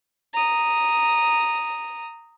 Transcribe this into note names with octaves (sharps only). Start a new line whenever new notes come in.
A#5 D#6